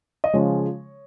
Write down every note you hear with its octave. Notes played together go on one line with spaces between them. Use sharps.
D#5
C#3 F3 G#3 C#5